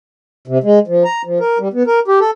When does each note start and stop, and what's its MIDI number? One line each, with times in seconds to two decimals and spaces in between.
0.47 0.58 48
0.64 0.79 56
0.87 1.04 53
1.05 1.22 82
1.25 1.39 53
1.40 1.58 70
1.59 1.68 55
1.73 1.83 59
1.87 1.99 70
2.08 2.19 67
2.20 2.31 69